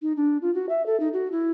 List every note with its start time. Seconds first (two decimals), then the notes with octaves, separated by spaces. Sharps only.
0.02 D#4
0.17 D4
0.42 F4
0.55 F#4
0.69 E5
0.86 A4
1.00 D#4
1.13 F#4
1.32 E4